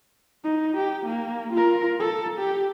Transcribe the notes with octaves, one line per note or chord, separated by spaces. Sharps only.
D#4
G4
A#3
F4 A#4
A4
G4